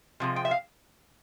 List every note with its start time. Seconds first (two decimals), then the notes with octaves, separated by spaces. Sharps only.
0.20 C3 F3 G#3
0.36 G5
0.45 E5
0.51 F5